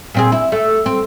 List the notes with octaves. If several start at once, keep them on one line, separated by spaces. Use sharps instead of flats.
A#2 C4 G#4
E4
A3
C4